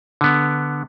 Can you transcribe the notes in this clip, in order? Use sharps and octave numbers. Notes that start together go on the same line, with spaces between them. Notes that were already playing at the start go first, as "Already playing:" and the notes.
D3 B3